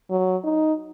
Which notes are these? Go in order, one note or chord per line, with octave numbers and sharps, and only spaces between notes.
F#3
D#4